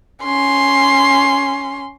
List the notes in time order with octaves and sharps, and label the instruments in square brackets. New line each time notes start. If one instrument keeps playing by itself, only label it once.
[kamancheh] C#4 C6